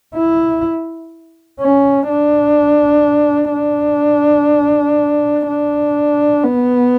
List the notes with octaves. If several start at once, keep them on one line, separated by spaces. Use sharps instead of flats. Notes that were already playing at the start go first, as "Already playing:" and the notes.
E4
C#4
D4
D4
D4
B3